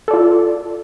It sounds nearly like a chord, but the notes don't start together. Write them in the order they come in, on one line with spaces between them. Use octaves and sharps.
A4 D5 F4